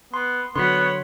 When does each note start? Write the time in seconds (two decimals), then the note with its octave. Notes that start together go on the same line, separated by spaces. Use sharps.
0.14 B3 C6
0.56 D3 F#3 B3 C#5 F#5 C6 B6